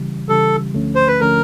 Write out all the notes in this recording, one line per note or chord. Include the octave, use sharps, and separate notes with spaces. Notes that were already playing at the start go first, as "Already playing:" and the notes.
Already playing: C#3 E3 G3
C#3 E3 G3 A4
D2 D3 F3 A3 C#4
C5
B4
D3 F3 A3 C#4 A#4